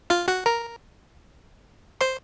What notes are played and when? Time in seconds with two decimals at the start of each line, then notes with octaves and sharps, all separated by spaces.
0.10 F4 F5
0.28 F#4 F#5
0.46 A#4 A#5
2.01 C5 C6